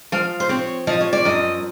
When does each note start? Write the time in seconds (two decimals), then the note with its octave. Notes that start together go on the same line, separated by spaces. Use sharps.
0.12 F3 F5
0.40 C5
0.49 C4 C#5
0.87 F3 D#5
1.01 C#5
1.13 D5
1.25 F#2 D#5